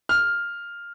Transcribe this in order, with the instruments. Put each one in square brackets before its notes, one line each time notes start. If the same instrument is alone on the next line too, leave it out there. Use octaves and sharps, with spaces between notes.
[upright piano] F6